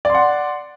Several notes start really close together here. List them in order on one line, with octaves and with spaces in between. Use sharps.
D5 C6 F#5